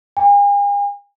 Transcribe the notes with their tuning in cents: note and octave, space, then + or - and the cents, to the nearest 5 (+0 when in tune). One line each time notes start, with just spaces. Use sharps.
G#5 -45